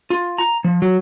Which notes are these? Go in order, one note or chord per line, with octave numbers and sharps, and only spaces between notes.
F4
A#5
F3
F#3